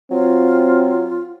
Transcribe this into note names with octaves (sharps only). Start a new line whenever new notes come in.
F#3 C4 F4